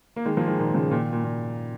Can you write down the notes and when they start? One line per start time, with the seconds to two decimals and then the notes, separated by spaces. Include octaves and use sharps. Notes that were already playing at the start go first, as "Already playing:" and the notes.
0.16 A#3
0.25 D#3 G#3
0.37 F3 A#3
0.47 D#3 G#3
0.59 A#2 D#3
0.75 C#3 F3
0.91 A#2 D#3
1.13 A#2
1.24 A#2